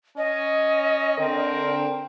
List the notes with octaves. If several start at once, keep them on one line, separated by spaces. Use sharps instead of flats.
C#4 D#5
D3 C4 A#4